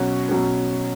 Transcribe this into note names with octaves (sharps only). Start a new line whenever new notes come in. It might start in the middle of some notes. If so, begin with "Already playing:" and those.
Already playing: B2 F#3 C#4 F#4 C#5
B2 F#3 C#4